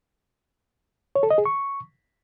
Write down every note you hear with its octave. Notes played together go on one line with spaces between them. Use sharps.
C#5
A4
D#5
G#4
C#6